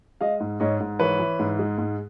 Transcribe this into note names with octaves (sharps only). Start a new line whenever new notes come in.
G#3 D#5 F5
G#2
G#2 C#5 D#5
G#2
E3 B4 C#5
E3
G#2
G#3
G#2